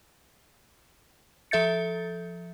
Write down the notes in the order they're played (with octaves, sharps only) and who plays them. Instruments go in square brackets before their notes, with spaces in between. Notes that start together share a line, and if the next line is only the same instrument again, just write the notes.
[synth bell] F3 A4 E5 G6 A6 C#7